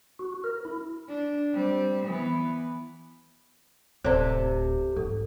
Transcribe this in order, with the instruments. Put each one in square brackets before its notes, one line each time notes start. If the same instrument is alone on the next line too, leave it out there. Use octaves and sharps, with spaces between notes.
[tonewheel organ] F#4
A#4
E4
[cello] D4
G3 C4
E3 B3
[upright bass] D1 [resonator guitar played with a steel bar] C3 A4 [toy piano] C5 D5
[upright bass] G#1 [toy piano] A4